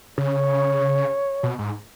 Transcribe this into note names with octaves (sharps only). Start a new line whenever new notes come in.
C#3 C#5
B2
G#2